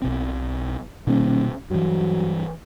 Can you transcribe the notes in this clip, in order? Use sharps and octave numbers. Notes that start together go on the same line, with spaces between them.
B1 B2 C4
D#1 B2 C#4
G2 E3 F#3